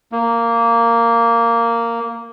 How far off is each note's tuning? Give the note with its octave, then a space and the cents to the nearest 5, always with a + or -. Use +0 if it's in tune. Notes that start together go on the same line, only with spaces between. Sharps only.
A#3 -10